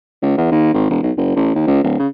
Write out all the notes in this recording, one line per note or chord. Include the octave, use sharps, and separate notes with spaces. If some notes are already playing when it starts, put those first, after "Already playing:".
C#2
E2
D#2
G#1
E1
B1
F#1
A1
D#2
C#2
D1
C#3